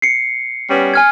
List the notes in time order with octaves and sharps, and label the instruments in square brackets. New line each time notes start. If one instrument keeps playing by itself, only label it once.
[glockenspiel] C7 C#7
[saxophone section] G3 B3 C#4
[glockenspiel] G#5 F6 G#6